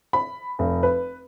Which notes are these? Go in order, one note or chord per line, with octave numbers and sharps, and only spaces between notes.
B5
F1
B4